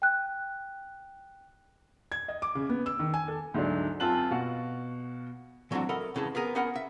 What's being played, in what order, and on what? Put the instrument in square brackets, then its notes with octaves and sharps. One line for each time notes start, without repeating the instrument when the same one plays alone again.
[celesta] G5 F#6
[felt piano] G#6
D#5
D6
C#3
B3
E6
D#3
G#5
A4
[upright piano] D2 G#2 F#3 D4
F#2 C4 F4 A5 F#6 F#7
B2 F#4 F5
[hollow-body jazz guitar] E3 F#3 A3 C4 D4 F#4
A4 A#4 D#5 E5 F#5 B5
F2 C#3 E3 G#3 A5
B3 G#4 A#4 G#5
B3 C#4 A#4 F#5 G#5 B5
E5